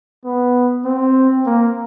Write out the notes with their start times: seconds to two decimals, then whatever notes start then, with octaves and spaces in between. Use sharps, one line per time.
0.25 B3
0.85 C4
1.46 A#3